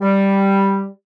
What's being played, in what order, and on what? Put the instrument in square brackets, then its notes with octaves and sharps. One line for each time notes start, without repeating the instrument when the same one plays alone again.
[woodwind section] G3